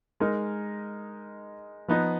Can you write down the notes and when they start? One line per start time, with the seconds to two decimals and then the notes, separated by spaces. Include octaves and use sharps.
0.20 G#3 D#4 A#4
1.88 F3 B3 D#4